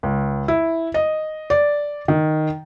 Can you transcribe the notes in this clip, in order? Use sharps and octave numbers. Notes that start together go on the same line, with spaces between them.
C#2
E4
D#5
D5
D#3